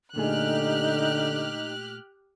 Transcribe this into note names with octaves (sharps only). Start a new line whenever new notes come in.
A#2 D3 A3 D#4 G4 G#4 F6 F#6